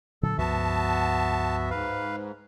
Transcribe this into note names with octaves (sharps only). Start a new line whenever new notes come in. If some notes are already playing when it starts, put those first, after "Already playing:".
A#2 D3 F#3 A4
C#2 G2 F3 B3 F#4 E5 A5
G#2 B4 F5